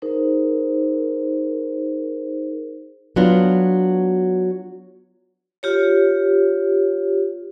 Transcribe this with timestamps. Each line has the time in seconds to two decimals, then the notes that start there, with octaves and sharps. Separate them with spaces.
0.02 D#4 G#4 A#4 C5
3.16 F#3 B3 D4 F4 F#4
5.63 F4 G4 C#5